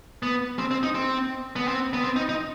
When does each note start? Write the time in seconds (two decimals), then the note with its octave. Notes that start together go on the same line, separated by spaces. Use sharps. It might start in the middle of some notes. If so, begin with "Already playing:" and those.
0.23 B3
0.59 C4
0.71 C4
0.83 D#4
0.95 C4
1.56 B3
1.68 C4
1.93 B3
2.04 C4
2.16 D#4
2.29 D#4